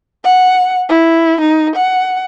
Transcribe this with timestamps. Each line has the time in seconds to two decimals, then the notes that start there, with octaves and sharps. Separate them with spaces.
0.24 F#5
0.89 E4
1.41 D#4
1.76 F#5